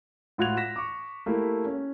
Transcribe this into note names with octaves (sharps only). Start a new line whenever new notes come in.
A2 F4 F#4 F#6 G#6 F7
A#6 B6 E7
C#6 D6
A3 A#3 E4 G4
C#4